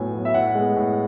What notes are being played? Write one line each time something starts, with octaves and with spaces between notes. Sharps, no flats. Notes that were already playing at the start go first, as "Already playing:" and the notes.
Already playing: A2 F#3 B3 G#5
F#3 B3
E5
A2 F#5
G#3 B3
A2